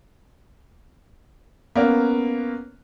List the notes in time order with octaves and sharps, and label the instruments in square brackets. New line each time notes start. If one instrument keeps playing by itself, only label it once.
[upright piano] A#3 B3 C#4